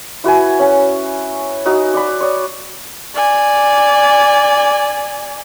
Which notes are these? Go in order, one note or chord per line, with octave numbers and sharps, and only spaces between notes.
E4 F#4 B4 G#5
C#4 G#5
D#4 F#4 D#6 E6
D5 B5
C#5 D5 D#6
D5 G#5